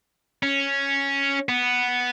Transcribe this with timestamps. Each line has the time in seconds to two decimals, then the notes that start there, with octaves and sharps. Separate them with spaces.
0.43 C#4
1.49 B3